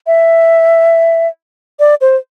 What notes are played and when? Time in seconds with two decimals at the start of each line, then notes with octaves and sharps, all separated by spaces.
0.07 E5
1.80 D5
2.01 C5